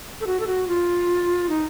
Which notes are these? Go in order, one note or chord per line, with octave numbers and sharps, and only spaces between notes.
A4
F#4
A4
F#4
F4
D#4